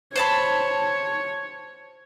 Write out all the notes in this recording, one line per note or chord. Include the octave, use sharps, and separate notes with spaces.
C5 C#5 A5 B5